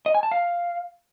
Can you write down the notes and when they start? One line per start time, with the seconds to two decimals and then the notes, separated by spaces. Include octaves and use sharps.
0.06 D#5
0.15 G#5
0.23 A5
0.31 F5